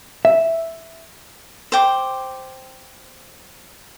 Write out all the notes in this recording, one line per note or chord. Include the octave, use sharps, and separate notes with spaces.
E5
C5 G5 D6